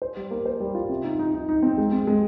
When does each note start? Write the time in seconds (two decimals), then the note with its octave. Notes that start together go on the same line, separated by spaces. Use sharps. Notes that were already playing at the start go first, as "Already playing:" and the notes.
0.02 C5
0.17 G3
0.31 A#3
0.46 C5
0.60 G3
0.75 F4
0.89 C3
1.04 D#4
1.19 D#4
1.34 D#4
1.49 D#4
1.63 C4
1.78 G#3
1.92 C4
2.07 G#3